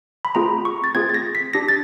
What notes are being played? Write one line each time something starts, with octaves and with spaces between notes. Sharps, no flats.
B5
A3 C4 F4 G#4 A#5
C#6
A6
A3 C4 F4 G#4 G#6
A6
A#6
B6
D4 G4 A#6
A6